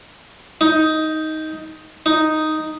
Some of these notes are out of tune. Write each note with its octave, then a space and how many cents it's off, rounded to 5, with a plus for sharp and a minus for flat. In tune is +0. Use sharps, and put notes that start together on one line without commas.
D#4 +10
D#4 +0